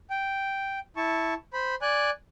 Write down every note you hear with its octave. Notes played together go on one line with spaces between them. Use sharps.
G5
E4 A5 C#6
C5 B5
D5 G#5 F#6